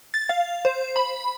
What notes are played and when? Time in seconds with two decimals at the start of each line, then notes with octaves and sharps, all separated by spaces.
0.14 A6
0.29 F5
0.65 C5
0.96 B5